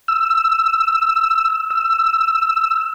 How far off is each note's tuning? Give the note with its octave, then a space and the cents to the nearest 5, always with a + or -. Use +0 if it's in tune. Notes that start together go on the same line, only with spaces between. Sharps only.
E6 +5
E6 +5